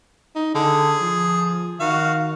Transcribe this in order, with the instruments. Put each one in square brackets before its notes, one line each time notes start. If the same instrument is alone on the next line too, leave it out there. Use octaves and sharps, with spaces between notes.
[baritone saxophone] D#4
[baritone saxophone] D3 [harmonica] G#4
[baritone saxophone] F3
[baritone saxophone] D#3 [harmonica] F#4 F5